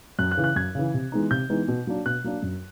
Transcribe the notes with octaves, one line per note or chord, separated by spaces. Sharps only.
F#2 F#6
F#6
C#3 E3
F#6
F#2 G#6
C#3 E3
C3
E3 G#3 B3 D#4
C3 G6
E3 G#3 B3 D#4
B2
F#3 A#3 D4
B2 F#6
F#3 A#3 D4
F#2